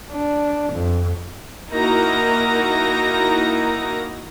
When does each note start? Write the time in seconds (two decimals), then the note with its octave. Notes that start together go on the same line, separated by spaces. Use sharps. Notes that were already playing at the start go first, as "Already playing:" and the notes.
0.11 D4
0.72 F2
1.70 A#3 D#4 E4 F#4 A#4 A#5